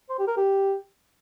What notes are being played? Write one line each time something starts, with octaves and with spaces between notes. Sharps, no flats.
C5
G4
A#4
G4